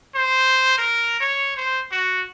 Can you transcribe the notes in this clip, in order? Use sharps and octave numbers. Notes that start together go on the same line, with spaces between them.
C5
A#4
C#5
C5
F#4